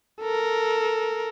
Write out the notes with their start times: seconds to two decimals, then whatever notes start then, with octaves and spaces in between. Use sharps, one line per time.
0.21 A4 A#4